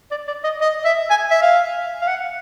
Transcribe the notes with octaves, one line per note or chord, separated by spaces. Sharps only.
D5
D5
D#5
D#5
E5
G#5
E5
F5
F5
F#5